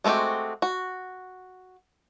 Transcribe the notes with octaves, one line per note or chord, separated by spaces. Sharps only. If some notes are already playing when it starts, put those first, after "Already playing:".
G#3 A3 C4 F#4 G4
F#4